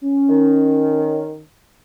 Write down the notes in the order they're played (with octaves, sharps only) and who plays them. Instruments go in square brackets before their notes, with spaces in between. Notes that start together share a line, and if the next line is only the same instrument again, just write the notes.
[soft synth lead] C#4
[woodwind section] D#3